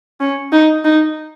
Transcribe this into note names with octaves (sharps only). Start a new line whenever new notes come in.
C#4
D#4
D#4